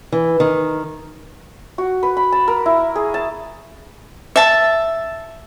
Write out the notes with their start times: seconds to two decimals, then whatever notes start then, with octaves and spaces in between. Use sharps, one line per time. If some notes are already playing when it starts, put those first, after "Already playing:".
0.12 E3
0.40 D#3
1.78 F#4
2.03 B4
2.17 B5
2.32 A5
2.48 A#4
2.66 E4
2.95 G#4
3.14 A5
4.36 E5 A5